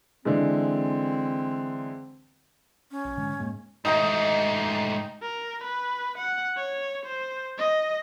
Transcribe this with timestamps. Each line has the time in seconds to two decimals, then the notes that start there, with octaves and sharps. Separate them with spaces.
0.25 D3 E3 G#3 C4
2.91 C#4
3.04 A#1
3.17 G#2 D3 G#3
3.40 G#2 G#3 A#3
3.85 G#2 A3 D#4 G5 A#5
5.22 A#4
5.64 B4
6.18 F#5
6.57 C#5
7.06 C5
7.58 D#5